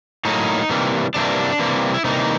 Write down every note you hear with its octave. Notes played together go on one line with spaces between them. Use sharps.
A2 F#3 A#3 D#4
C3 E3 G3 A#3
C3 E3 G3 A#3 D4
C3 E3 G3 A#3
E4
C3 E3 G3 A#3 D#4